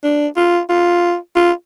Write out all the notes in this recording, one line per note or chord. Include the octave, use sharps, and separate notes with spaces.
D4
F4
F4
F4